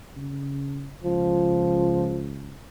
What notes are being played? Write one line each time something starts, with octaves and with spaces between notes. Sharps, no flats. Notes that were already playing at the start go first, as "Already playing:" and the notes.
C#3
C#2 F3